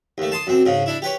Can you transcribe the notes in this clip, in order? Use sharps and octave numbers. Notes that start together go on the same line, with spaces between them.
D#2 A3
A5 C6 D#6
F#2 C4
G#2 C#3
D4 E4
G4 B4 C#5